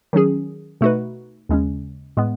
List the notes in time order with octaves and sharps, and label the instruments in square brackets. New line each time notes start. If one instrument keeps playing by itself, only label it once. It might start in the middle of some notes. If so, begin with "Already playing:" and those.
[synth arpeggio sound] D#3 F#3 C#4 G#4
B2 A3 D#4 F#4 B4
D#2 C#3 G#3 C#4
A2 G#3 B3